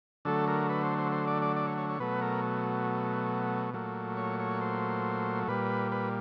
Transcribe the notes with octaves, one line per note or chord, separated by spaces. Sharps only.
D3 F#3 A3 A4
A#4
B4
C5
C5
C5
D5
D5
D5
C#5
C#5
C#5
B2 F#3 A3 B4
A#4
A#2 F#3 A3
C#5
C#5
C5
A#2 G3 B4
B4